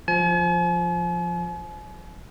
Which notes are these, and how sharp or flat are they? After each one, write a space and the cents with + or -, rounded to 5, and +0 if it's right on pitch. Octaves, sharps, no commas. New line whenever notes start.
F3 +0 G#5 +45